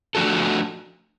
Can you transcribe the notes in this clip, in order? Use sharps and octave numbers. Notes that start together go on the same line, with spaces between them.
F3 A3 D4 F#4 A4